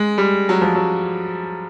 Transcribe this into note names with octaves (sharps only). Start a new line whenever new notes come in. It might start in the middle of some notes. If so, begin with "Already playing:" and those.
Already playing: G#3
G3
F#3
F3
F#3